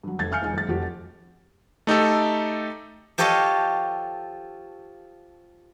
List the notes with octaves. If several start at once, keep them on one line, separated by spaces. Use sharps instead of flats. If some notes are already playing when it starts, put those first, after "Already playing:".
G2 F#3
F1 G#6 A6
E5 F5 G#5 F6 G6 C#7
E1 D#4 G#5
F#1 A6
F1 F2 F#4 G4
A3 D#4 G4 A4
F3 G4 A4 C#5 D#5 F5